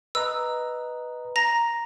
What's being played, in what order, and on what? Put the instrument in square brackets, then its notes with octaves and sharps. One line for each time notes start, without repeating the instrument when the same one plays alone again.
[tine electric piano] B4 D#5 A#5 [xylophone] E6
[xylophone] A#5 A#6